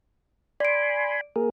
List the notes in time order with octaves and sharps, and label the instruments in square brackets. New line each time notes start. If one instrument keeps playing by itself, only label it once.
[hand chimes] D5 D7 [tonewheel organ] G#5 B5 C6
[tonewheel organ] A#3 G#4 A#4